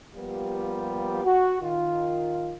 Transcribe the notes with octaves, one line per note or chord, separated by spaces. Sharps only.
F3 G3 A#3 B3 F4 G4
F#4
D#3 F4